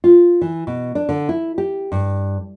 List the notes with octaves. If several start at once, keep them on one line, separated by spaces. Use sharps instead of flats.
F4
E3
B2
D4
D3
E4
G4
G2